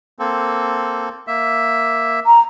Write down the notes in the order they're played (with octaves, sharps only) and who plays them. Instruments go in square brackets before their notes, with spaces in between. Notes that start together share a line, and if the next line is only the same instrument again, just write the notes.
[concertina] A#3 C4 A4
A#3 E5
[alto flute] A#5